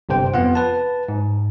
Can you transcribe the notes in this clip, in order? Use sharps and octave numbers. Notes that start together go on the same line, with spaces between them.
G1 G2 C3 C5 G5
F2 B3 F4 F#5
B4 A5
G#2